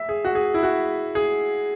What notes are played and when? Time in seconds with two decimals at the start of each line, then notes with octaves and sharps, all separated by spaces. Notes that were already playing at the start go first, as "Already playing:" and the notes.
Already playing: E5
0.09 G#4
0.25 F#4
0.35 G#4
0.54 E4
0.63 F#4
1.15 G#4